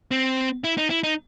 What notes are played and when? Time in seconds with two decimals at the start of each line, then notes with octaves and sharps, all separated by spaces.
0.11 C4
0.64 E4
0.77 D#4
0.90 E4
1.03 D#4